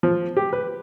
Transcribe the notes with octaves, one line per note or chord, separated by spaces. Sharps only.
F3
G4
B4